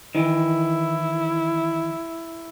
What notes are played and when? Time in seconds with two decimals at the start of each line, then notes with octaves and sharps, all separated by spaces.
0.15 D#3 E3 E4